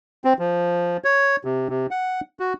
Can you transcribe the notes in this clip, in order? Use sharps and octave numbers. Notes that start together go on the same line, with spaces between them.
C4
F3
C#5
C3
C3
F#5
F#4